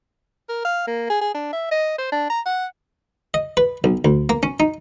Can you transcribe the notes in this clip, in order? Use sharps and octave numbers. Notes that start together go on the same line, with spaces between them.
A#4
F5
A#3
G#4
G#4
D4
E5
D#5
C5
D4
A#5
F#5
D#5
B4
B1
D2
A#3
C#4
D#4